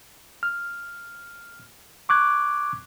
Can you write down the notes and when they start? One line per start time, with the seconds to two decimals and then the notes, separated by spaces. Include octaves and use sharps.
0.43 F6
2.09 C#6 D6 F#6 G#6